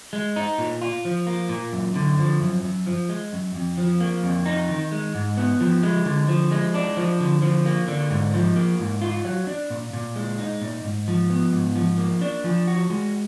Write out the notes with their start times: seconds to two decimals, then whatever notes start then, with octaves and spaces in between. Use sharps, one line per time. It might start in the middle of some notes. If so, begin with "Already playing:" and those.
0.13 G#3
0.36 D#4
0.58 A#2
0.82 F4
1.05 F3
1.27 A#3
1.49 A#2
1.72 F#2
1.95 D3
2.19 F3
2.41 F#2
2.65 F#2
2.87 F3
3.09 G#3
3.33 F#2
3.55 F2
3.78 F3
4.00 A#3
4.23 F2
4.46 D#4
4.69 D#3
4.92 G#3
5.15 G#2
5.37 B3
5.61 F3
5.83 G#3
6.06 D3
6.28 F3
6.51 G#3
6.74 D4
6.97 F3
7.20 D3
7.42 F3
7.66 A#3
7.88 D3
8.10 G#2
8.34 F3
8.56 A#3
8.80 G#2
9.02 F4
9.25 F#3
9.47 D4
9.70 A#2
9.93 A#2
10.16 G#3
10.38 D#4
10.62 A#2
10.85 G#2
11.08 F3
11.30 B3
11.52 G#2
11.76 F3
11.98 A#3
12.21 D4
12.44 F3
12.67 F#4
12.90 G#3